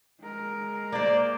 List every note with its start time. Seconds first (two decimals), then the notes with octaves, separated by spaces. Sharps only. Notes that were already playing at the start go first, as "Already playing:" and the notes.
0.21 G#3 A#4
0.92 A#3 C5 D5